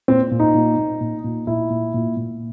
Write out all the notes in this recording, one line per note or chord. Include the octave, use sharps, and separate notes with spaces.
A#2 C4
A#2
D#4
A#2
A#2
A#2
A#2
A#2 E4
A#2
A#2
A#2